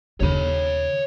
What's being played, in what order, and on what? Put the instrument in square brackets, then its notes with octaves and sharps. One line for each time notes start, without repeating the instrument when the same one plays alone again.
[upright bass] D#2 C#3 [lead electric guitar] C#5 B5